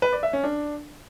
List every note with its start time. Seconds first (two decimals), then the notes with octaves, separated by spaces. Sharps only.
0.02 B4
0.13 D5
0.23 E5
0.33 C#4
0.44 D4